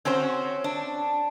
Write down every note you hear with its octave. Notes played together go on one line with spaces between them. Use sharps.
C4 C#4 F#4 C5
D4